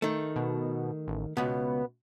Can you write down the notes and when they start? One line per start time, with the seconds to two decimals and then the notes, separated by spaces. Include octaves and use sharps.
0.02 D#3 A3
0.36 B2
1.08 A1
1.37 C#2 B2 B3